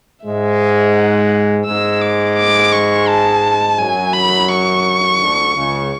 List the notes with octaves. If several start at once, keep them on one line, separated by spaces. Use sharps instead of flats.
G#2 G#3 E5
F#5
G#2 G#3 E6
D6
D6
C#6
A5
F#2 F#3 G#5
B5
C#6
D2 D3
C#2 C#3